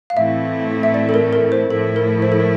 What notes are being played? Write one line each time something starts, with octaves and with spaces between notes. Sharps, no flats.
F5
A2 E3 A3 C4 E4 E5
E5
D5
A4
A#4
A#4
C5
A2 F3 A3 E4 A4
A#4
C5
A4
A#4